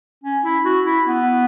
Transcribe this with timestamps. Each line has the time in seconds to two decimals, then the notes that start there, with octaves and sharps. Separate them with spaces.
0.24 C#4
0.45 E4
0.65 F#4
0.86 E4
1.06 B3